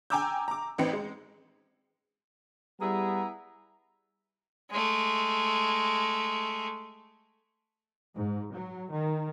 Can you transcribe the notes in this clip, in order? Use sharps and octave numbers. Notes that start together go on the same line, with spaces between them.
G5 G#5 A#5 D6 E6 G6
A#5 D6
A1 C4 D#4 B4 G5 C#7
G#3
G3 B3 E4 G#4 A#5
G#3 A3
G#2
F#3
D#3